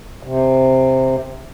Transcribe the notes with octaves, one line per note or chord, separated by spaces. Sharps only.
C3